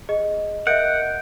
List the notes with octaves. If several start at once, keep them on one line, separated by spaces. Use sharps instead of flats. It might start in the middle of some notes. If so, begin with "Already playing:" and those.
G#4 D#5
A#4 D#5 E5 F#5 G6 D7